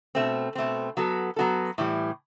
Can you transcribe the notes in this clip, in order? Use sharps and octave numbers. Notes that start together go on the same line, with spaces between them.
B2 A3 C4
B2 A3 C4
F#3 B3 F#4 A4
F#3 B3 F#4 A4
A2 E3 G3